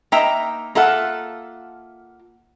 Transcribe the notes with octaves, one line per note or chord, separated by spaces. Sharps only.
A#3 D#4 E5 G5 A#5
A#3 F4 A4 E5 F#5